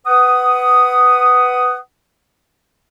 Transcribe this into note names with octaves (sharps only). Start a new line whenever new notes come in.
B4 F#5 D#6